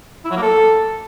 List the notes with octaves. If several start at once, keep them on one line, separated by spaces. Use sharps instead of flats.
E4
F#3
A#3
A4